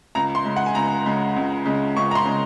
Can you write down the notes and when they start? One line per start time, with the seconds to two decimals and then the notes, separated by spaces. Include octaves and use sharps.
0.15 C#2 A#5
0.35 C6
0.45 C#3 G#3
0.56 F#5
0.66 G#5
0.75 C#2 A#5
1.06 C#3 G#3
1.36 C#2
1.66 C#3 G#3
1.96 C#2 C#6
2.11 A#5
2.15 C6
2.26 C#3 G#3